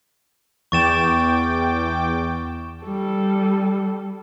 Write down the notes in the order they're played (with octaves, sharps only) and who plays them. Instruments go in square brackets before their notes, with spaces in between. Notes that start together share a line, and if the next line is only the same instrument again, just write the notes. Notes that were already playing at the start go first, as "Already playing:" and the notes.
[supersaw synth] E2 G5 D6 [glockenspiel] C#6 A6 E7
[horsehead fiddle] G3 A4